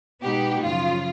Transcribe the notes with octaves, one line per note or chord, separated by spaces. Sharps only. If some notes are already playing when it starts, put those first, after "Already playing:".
B2 G#3 B3 D#4 F#4 G4
F#2 C#3 F3 F4